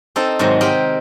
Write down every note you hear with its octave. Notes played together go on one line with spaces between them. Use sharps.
C4 D#4 A4
G#2 C3 D#3 F#3
C4 G4 A#4 D#5